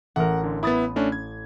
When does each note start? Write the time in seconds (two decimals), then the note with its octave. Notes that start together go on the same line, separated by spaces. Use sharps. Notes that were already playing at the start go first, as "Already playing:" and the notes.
0.16 A1 A#4 F#5
0.44 D3
0.63 B3 E4 B5 D#6 A6
0.96 A3 C#4 D4
1.12 G#6